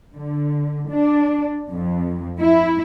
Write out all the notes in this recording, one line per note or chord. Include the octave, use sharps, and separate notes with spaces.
D3
D4
F2
E4